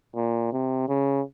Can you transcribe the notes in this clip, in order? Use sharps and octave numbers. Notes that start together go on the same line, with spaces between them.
A#2
C3
C#3